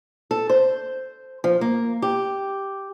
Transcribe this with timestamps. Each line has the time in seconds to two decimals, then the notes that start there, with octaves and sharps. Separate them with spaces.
0.31 A4
0.49 C5
1.44 F3
1.61 A#3
2.02 G4